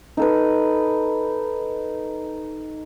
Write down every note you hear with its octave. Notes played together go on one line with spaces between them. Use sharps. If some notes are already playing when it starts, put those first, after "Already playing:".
D#4 A4 B4